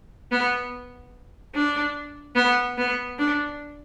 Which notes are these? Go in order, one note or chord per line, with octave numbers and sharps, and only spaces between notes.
B3
D4
B3
B3
D4